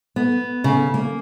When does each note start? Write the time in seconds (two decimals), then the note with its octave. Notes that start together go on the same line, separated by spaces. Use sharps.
0.16 B3
0.64 C#3
0.94 A#3